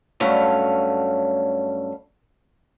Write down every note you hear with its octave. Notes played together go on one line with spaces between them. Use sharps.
G2 F#3 A3 C#4 F5